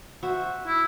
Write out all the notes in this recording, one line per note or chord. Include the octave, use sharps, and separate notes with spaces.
F#4 C5 E5
E4